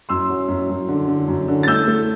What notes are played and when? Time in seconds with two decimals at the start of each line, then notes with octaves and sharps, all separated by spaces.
0.09 F#2 C6 E6
0.30 F#3
0.48 F#2
0.69 F#2
0.89 D3
1.08 D3
1.28 F#2
1.48 D3
1.63 A6
1.67 A3 E6 G6
1.87 A3